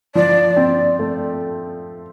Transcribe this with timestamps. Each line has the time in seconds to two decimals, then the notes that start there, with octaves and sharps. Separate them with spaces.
0.15 F3 D5
0.57 C4
0.99 A3